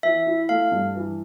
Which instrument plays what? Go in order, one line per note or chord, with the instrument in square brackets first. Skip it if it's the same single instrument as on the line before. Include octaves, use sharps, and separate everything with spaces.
[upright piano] E3 [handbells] E5
[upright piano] E4
[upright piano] A3 [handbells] F5
[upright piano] G2
E3